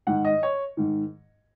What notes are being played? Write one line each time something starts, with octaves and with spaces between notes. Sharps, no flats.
G#2 D#3 F#5
D#5
C#5
G#2 D#3